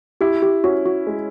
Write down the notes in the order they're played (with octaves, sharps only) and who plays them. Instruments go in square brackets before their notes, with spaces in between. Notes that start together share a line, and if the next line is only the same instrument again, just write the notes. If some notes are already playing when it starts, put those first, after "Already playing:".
[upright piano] E4 [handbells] G4
[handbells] G4
[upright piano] C#4 [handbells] F#4
[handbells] F#4
[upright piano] G#3